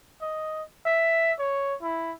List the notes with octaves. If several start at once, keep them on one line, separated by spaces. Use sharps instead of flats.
D#5
E5
C#5
E4